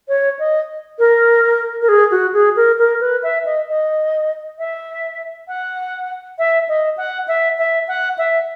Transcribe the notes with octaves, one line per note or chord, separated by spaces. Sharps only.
C#5
D#5
A#4
A#4
G#4
F#4
G#4
A#4
A#4
B4
E5
D#5
D#5
E5
F#5
E5
D#5
F#5
E5
E5
F#5
E5